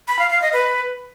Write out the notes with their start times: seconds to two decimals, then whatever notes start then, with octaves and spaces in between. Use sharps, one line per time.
0.08 B5
0.19 F5
0.30 F5
0.42 D#5
0.53 B4